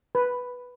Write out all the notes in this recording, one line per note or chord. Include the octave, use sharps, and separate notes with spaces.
B4